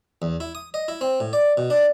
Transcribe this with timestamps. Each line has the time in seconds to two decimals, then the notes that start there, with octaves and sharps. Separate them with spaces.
0.22 E2
0.40 E4
0.55 D#6
0.74 D#5
0.88 E4
1.01 C4
1.20 A2
1.33 D5
1.57 B2
1.70 D4